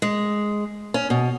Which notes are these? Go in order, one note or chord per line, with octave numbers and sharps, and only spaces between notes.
G#3
C#4
B2